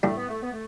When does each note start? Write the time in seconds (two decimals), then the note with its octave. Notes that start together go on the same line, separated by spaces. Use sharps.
0.03 A2 G3 A3 D4
0.16 B3
0.27 A3
0.40 B3
0.51 A3